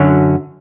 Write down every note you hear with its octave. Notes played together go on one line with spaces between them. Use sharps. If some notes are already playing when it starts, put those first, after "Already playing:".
Already playing: F#2 D3 F#3 C#4